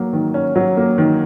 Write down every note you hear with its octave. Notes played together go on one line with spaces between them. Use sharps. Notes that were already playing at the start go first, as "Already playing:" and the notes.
Already playing: F#3 A#3
D#3
C#4
F#3
A#3
D#3